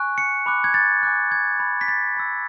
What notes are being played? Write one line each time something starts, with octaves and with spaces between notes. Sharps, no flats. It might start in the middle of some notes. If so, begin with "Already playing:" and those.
Already playing: G#5 C#6 F#6
C#7
B5 D6 F#6
G#6
A6
G#5 D6 F#6
G#6
G#5 B5 F#6
B6
A6
B5 E6